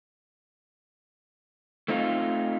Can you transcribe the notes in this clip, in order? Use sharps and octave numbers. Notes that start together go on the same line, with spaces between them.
A3 C4 D#4 F4